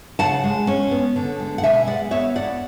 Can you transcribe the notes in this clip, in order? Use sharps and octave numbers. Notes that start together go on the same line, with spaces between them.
C#3 F#5 A5
G#3
C#4
B3
D3
G#3
F#5
B2 E5 G#5
G#3 D5 F#5
B3 C#5 E5
E2 D5 F#5